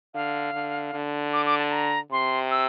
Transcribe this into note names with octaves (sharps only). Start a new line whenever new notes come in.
D3 F5
D3
D3
D6
D6
A5
A#5
C3 C6
E6